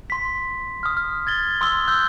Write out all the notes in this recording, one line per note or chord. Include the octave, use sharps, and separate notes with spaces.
C6 B6
D#6 F6
F6
G#6 A6 G7
C6 D#6 E6 G7
E6 F#6 G6